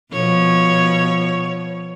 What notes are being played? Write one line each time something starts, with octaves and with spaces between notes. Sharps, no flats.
B2 F3 C#5